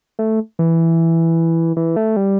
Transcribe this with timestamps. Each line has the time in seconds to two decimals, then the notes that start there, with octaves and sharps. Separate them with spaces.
0.19 A3
0.59 E3
1.77 E3
1.96 A3
2.16 G3